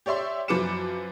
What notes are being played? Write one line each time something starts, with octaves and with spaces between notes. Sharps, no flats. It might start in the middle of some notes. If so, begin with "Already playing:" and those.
G4 C#5 D5 E5 C6
F#2 F3 B4 D6 C#7 E7